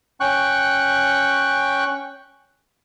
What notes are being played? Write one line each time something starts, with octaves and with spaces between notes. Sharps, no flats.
C#4 G5 C#6 F#6